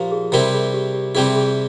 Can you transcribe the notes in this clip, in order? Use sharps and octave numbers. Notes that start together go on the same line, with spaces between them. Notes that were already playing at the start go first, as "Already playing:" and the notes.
Already playing: A#2 F3 A#3 G4 C5
G#4
C3 G3 C4 E4 A#4
G#4
G4
G4
C3 G3 C4 E4 G#4
G#4